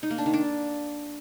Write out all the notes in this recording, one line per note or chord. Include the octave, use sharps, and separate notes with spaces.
D#4
A#3
D4
D#3
D4